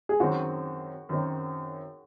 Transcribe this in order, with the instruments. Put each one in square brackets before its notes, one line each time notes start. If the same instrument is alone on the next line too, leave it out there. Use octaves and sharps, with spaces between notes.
[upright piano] G#4
[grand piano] F#2 D#3 F#3 C4 D#4 [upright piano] F#4
[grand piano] F#2 D#3 F#3 C4 D#4